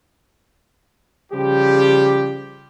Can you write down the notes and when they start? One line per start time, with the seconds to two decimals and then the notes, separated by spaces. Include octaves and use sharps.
1.32 C#3 F3 G3 G4